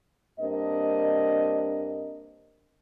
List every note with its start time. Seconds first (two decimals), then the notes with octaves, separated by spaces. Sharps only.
0.40 G2 A#3 C4 D4 D#5